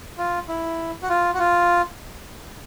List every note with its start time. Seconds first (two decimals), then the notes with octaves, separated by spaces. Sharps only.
0.18 F4
0.48 E4
1.02 F#4
1.09 F4
1.34 F#4
1.39 F4